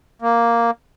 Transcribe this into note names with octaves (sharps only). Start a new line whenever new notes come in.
A#3